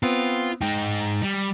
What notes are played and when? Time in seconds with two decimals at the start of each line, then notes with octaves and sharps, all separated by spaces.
0.03 B3 C4 F4
0.61 G#3 D#4 G5
1.23 G3